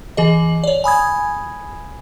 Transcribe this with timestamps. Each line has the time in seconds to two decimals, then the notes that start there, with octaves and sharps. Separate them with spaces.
0.17 E3 G#4 D#5
0.64 C#5 D5
0.84 G#5 B5 D#6 G#6